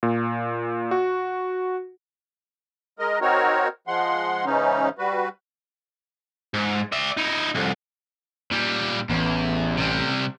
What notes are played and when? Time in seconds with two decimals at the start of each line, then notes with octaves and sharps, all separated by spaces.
0.03 A#2
0.91 F#4
2.99 G#3 A#4 D#5
3.21 C4 D#4 F#4 A#4 C#5
3.88 F3 G#3 F#5 C6
4.45 G#2 C#3 E3 C#4 D#4
4.98 G3 F#4 B4
6.54 G#2
6.92 D5 E5
7.17 D#4 E4
7.55 C2 F2
8.52 A#2 G3
9.10 A1 E2
9.77 C3 G3